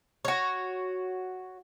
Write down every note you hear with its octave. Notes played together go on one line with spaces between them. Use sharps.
F#4 C#5